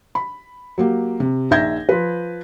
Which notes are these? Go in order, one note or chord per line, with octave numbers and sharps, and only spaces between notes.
B5
F#3 A#3 G4
C3
A#1 D#4 E5 G6 G#6 A#6
F3 B4